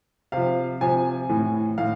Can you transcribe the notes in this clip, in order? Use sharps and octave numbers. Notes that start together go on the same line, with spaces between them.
C3 F3 F5
C3 F3 G#5
A2 E3
A2 E3 F5